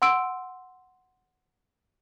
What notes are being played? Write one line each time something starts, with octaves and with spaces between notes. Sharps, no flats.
F#5 C6 E6 D7